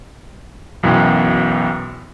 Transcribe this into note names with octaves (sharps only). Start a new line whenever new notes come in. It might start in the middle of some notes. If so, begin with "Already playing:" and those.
B1 F#2 E3 B3 G5